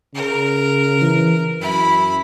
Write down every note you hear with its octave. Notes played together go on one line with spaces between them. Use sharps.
C#3 A#4
E3
F#2 E4 B5